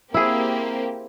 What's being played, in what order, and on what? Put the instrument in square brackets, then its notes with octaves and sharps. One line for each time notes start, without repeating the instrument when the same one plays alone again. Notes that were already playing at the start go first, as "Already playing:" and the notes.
[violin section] A#3 C4 G4 [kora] E4 G#4